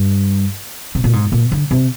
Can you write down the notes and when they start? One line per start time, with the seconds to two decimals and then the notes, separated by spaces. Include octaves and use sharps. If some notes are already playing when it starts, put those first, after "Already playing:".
Already playing: G2
0.95 C3
1.04 A#2
1.13 G#2
1.32 A#2
1.52 D3
1.71 C3